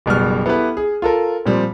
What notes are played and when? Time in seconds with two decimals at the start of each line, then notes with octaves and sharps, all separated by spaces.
0.06 F#1 B2 G3 F6
0.46 B3 E4 G4 A4 B4
0.77 G#4
1.02 F4 A4 A#4
1.46 A#2 F3 G3 C4